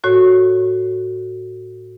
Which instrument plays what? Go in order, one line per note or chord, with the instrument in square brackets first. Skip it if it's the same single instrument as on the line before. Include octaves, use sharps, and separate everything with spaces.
[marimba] A2 F#4 C#5